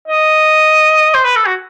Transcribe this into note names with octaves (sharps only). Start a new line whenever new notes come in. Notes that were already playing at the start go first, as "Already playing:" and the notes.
D#5
C5
B4
A4
F#4